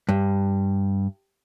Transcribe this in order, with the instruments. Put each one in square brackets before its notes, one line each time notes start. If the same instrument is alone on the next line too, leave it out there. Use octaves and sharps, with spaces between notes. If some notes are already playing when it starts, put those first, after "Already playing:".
[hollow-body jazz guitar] G2